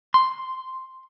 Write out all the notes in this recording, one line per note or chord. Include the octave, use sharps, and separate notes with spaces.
C6